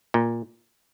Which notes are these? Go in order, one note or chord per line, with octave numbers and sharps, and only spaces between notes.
A#2